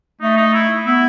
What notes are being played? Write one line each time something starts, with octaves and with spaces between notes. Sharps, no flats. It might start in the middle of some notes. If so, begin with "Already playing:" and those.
A3 D#4
D#4
E4
B3 E4